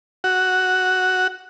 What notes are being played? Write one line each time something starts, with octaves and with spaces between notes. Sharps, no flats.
F#4